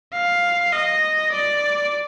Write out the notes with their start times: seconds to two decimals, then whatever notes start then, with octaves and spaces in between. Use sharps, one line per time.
0.13 F5
0.72 D#5
1.32 D5